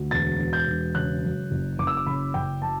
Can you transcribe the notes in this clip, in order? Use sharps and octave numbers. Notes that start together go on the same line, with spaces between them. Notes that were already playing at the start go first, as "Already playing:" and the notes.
Already playing: D2
E1 A6
E1
G6
E1
C#3 F#6
F#2
F#1
F#1 D6
E6
D6
C#3 B5
F#1 G5
F#3 A5